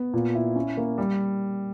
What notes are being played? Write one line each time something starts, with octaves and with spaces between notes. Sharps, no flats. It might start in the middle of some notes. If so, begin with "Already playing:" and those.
Already playing: B3
A#2
E4
C#4
A#3
G3